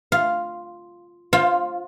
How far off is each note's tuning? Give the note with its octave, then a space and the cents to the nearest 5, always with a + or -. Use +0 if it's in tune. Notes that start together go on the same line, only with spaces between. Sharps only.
F4 +0 F5 +0
F4 +0 C5 +25 F5 +25